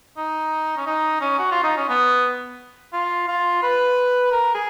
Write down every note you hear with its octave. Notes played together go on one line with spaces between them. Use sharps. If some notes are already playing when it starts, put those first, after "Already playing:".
D#4
C#4
D#4
C#4
F#4
F4
D#4
C#4
B3
F4
F4
B4
A#4
G#4